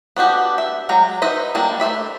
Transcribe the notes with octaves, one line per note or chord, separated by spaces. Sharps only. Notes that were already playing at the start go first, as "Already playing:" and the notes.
B3 D4 F#4 G4
E5
F#3 G#3 G4 A#5
D#4 B4 C5 D#5 E5
F#3 G3 A#3 D4
A3 C5 E5 B5